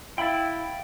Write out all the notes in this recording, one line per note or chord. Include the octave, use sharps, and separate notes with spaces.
E4 E5 F5 G5 B5 A6